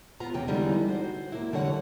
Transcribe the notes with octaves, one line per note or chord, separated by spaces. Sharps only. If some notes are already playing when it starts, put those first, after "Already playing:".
B3 F4 A#5
E2 C3 C#4 G5
D3 E3 G3 G#3 B3 D#4
F#4 C5
A#3 E4
F2 D3 E3 G3 C#5 F#5